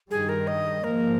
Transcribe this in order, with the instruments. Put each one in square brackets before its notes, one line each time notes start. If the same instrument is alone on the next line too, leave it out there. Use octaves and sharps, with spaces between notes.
[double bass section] G2 D#3 G3 [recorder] G#4
[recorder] A#4
D#5
[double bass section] G#2 F3 A#3 [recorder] A#4